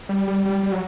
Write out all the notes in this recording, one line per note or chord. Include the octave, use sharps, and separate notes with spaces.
G3
G3
G3
G3
F#3